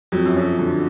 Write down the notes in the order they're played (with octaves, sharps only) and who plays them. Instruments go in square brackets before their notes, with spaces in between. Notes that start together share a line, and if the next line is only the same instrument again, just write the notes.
[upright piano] F2 [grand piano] F#3
[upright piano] F#2
[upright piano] F2 [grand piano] C#4
[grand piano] D3